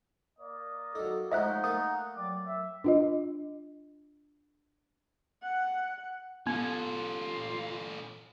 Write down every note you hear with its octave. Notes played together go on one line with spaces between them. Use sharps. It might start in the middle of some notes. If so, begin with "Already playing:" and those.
A#3 D5 D#5
F#3 D#4 A4
F3 G#3 A3 D#4 D#5 E5 F#5 F#6
A3 A#3 A4 D#6
F#3 G4 D5 D6
E5
D4 F4 D#5
F#5
B3 C#4 F4 A4